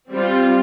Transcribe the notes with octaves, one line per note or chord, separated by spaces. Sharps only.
G3 C4 F4